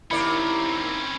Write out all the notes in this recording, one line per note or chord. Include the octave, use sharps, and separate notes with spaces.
D#2 A#3 C4 C#4 E4 D5 B5